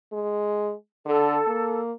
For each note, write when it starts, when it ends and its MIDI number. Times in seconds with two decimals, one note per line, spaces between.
0.13 0.74 56
1.06 1.40 50
1.06 1.78 69
1.47 1.92 58